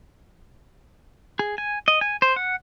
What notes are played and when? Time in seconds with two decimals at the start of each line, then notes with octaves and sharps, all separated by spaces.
1.39 G#4
1.58 G#5
1.88 D#5
2.01 G#5
2.22 C5
2.36 F#5